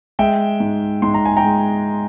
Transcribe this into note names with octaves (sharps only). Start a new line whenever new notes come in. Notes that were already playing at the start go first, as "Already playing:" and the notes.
G#3 E5 G5
G#2
G#2 C6
A#5
G#5
G5 A#5
G#3